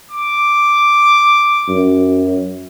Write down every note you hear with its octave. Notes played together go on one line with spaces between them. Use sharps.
D6
F#2